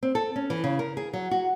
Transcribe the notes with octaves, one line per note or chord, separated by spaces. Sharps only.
C4
A4
C#4
E3
C#3
A#4
G#4
F#3
F#4